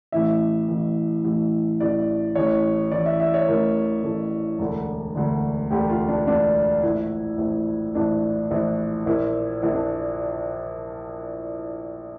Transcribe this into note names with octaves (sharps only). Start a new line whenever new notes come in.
A1 A2 E3 E5
A1 A2 E3
A1 A2 E3
A1 A2 E3 D5
A1 A2 E3 C#5
A1 A2 E3 D5
E5
E5
C#5
A1 A2 E3 A#4
A1 A2 E3 A4
E1 D2 D3
E1 D2 D3
E1 D2 D3 G4
F4
D4
E1 D2 D3 D4
A#1 A2 E3 E4
A#1 A2 E3
A#1 A2 E3 D4
A#1 A2 E3
A#1 A#2 E4
A#1 A#2 E4
D4